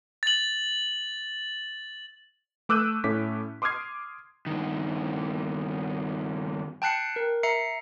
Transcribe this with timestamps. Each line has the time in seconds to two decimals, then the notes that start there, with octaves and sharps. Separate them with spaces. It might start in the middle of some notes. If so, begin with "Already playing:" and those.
0.23 A6 F#7
2.69 A3 D6 E6 F#6 G6 D#7
3.04 A2 A3 C#4 D6 B6
3.62 C6 D6 D#6 F6 G#6 C7
4.47 G2 D#3
6.82 G5 A5 F#6 C7 C#7
7.16 A#4
7.43 E5 A#5 C7 C#7